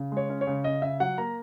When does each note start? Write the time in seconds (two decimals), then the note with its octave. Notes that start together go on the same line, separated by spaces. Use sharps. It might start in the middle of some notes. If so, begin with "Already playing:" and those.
Already playing: C#3
0.12 G#3
0.17 C#5
0.29 C#4
0.41 C#5
0.47 C#3
0.64 C#3 D#5
0.82 C#3 E5
1.00 F#3 F#5
1.18 A#3 A#5